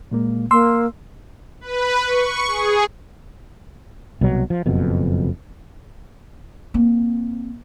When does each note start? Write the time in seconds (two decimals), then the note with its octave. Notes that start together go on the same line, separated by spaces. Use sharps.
0.11 A#2 G#3 A#3
0.51 A#3 C6 E6
1.61 B4
2.05 C#6
2.47 G#4
4.21 C2 B2 F#3
4.50 F3
4.66 F#1 F2 B2
6.74 A#3 C4